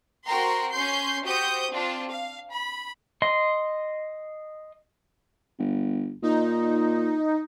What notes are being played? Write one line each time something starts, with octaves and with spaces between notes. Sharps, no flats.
C4 F#4 A#4 G5 A#5 C6
C#4 C6 G6 C7
F#4 G4 C5 D#6 G6
C4 D4 F4
F5
B5
D#5 C6
G1
A#2 D#4